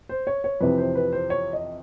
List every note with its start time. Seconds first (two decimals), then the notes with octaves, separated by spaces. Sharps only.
0.09 C5
0.27 C#5
0.44 C#5
0.61 F2 C3 E3 B4
0.78 C5
0.95 B4
1.13 C5
1.30 C#5
1.53 D#5